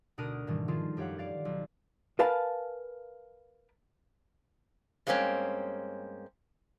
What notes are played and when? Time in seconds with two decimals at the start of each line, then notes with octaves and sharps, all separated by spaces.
0.18 D2 B2 D4 A#4 D#6 D#7
0.47 G#2 B2 D#3 E3 G3 A3
0.68 D#3 F3 F4 G#4 A4
0.97 F#2 G4 C#5 F5 F#5
1.18 D5 F5 A6
1.45 B1
2.19 A#4 B4 F5 G#5 A5
5.07 G2 G#3 A#3 C4 C#4